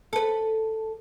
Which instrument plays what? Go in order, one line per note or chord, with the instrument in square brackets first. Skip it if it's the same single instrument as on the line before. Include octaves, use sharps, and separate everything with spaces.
[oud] A4 B4